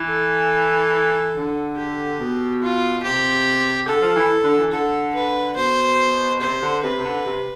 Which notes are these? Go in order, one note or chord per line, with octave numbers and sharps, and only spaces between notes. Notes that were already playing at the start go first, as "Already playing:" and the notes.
Already playing: E3
A4
D3
G4
B2
F4
C3 G4
D3 A4
F3
E3
D3
E3
D3 A4
B4
B2 C5
C3 C5
D3
C3 B4
C3
D3
C3